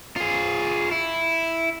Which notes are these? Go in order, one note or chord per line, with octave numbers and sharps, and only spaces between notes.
F4 G#4
E4